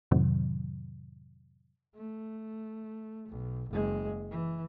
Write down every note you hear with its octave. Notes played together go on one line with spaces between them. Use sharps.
F2 A2 C3 D#3 F#3
A3
B1
F#1 G#3
E3